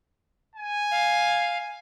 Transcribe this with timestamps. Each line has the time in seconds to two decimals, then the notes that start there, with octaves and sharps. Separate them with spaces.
0.56 G#5
0.91 F5